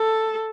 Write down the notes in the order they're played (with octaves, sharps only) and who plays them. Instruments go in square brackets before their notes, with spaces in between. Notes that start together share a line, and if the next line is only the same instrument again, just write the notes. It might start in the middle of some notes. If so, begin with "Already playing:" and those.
Already playing: [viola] A4